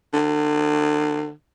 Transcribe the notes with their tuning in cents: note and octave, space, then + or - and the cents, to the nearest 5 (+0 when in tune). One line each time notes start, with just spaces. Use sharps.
D3 +30